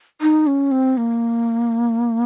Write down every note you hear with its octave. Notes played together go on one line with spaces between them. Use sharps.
D#4
C#4
C4
A#3